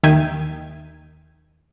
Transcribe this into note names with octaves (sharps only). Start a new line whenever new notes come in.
D#2 D#3 E5 G5 G#6 D#7